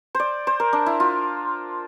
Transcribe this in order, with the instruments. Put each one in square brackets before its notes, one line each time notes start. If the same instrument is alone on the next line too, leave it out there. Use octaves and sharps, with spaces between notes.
[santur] C5 D5
C5
A#4
D4
E4
F4